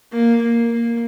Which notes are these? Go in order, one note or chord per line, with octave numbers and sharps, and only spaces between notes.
A#3
A#3
A#3